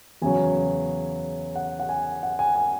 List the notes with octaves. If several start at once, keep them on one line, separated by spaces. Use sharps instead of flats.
E2 C#3 F#3 G#5
F#5
F#5
G#5
F#5
G#5
G#5